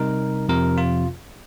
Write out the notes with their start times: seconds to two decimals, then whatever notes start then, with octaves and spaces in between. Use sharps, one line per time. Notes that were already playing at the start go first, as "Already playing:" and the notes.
Already playing: C3 G3 D#4 A#4
0.49 F2 C3 F3 A#4
0.78 F4